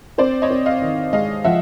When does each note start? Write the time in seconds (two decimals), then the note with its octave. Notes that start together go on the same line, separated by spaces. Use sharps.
0.18 C4 C5 D5
0.42 C#5 D#5
0.50 C4
0.66 D#5 F5
0.82 D#3
1.13 G#3 D#5 F5
1.44 F3 E5 F#5